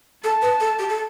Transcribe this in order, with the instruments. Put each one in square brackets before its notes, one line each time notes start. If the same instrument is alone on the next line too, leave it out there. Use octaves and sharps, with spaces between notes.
[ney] A4 [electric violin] A5
[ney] B4
A4
G4
A4